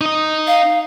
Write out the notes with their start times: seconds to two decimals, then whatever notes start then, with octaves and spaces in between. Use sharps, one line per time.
0.01 D#4 D#5
0.47 F5